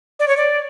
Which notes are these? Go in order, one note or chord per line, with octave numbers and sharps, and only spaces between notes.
D5
C#5
D5